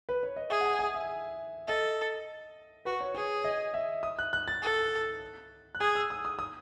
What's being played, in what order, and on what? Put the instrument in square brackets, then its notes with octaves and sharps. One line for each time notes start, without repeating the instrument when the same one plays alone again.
[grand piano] B4
C#5
D#5
[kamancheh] G#4 [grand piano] E5
[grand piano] F#5
G#5
G#5
E5
[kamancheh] A4 [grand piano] D#5
[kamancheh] F#4 [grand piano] B4
[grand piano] C#5
[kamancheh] G#4 [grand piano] C#5
[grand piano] D#5
E5
D#6
F#6
F#6
A6
[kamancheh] A4
[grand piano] F#6
[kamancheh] G#4 [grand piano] G#6
[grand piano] E6
D#6
D#6
D#6